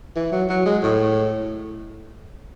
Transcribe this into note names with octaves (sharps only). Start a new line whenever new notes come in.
E3
F#3
F#3
G#3
A2